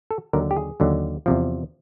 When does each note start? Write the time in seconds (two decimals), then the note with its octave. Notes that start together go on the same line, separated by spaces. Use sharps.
0.11 A4
0.33 D#2 D3 F#3 A#4
0.51 G4
0.57 G#4
0.80 D#2 D3 F#3
1.26 E2 C3 F3